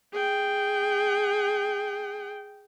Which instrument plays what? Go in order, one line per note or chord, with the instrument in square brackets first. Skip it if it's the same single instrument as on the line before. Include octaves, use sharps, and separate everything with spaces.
[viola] G#4 G5